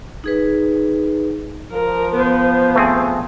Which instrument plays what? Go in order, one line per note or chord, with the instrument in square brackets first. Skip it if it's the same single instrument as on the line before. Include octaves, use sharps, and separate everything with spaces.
[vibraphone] D#4 G#4 B4
[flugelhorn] F3 [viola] A#4
[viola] B3 [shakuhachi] C5
[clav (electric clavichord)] A3 C4 G#4